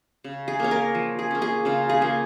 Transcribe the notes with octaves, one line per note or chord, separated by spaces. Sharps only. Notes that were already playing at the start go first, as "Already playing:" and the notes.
C#3
G#4
A#3 C#4 C#5
A#4
F3
G#4
A#3 C#4
G#4
C#3 F4
G#4
A#3 C#4 G#4